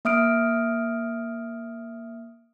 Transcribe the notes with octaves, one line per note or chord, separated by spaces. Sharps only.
A#3 E5 D#6 F6 D7